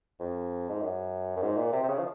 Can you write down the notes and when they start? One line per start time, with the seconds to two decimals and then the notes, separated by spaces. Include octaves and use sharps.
0.20 F2
0.69 G#2
0.81 F#2
1.36 F#2
1.42 G#2
1.57 A#2
1.72 C3
1.83 C3
1.88 C#3
1.99 F3